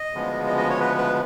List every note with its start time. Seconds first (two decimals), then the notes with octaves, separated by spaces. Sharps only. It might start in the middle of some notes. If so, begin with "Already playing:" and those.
Already playing: D#5
0.13 D2 C#3 F3 G#3 B3
0.47 D#5
0.58 D#5
0.70 C#5
0.80 B4
0.97 B4